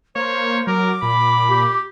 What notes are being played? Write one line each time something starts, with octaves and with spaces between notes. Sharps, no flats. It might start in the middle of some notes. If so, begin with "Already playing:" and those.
A#3 C5 C#5
F#3 A#4 D6
A#2 B5
G4